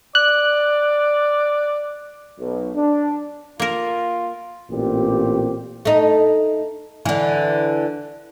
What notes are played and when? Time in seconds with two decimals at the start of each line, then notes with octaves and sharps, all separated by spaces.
0.15 D5 F#6
2.39 B1
2.76 D4
3.60 A#3 F4 A#4
4.70 A1 A#2 C4 G4
5.85 A3 D#4
7.05 D3 E3